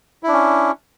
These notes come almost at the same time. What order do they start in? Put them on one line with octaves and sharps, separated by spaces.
E4 D4 C#4